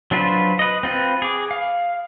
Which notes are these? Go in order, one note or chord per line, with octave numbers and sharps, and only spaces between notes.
F#3 D4 F4 B4 C5
B4 D#5
C4 F4 B4
G#4 D6
F5